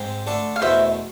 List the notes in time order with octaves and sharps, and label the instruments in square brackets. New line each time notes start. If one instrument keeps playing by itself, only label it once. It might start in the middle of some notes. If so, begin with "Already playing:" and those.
Already playing: [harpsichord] G#2 G#3 C4
D3 A3 D4 A4
[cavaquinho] F5
[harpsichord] E2 B2 A3 E4 [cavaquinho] C5 E5